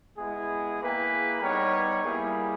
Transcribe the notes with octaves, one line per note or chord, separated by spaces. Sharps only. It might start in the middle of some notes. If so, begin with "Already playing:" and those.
G#3 B3 E4 G#4
A#3 E4 G#4 B4 G5
G3 B3 D#4 A#4 C#5
G3 A#3 E4 G#4